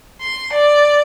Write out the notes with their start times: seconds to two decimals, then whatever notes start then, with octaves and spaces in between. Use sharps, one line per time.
0.21 C6
0.52 D5